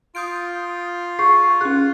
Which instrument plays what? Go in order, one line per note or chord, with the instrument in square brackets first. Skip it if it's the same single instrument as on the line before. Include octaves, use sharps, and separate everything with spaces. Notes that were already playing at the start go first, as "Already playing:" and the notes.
[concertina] F4 [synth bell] D#6 G6 D7
[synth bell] G#4 [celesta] C#6 C7
[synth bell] C#4 G#4 [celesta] F#6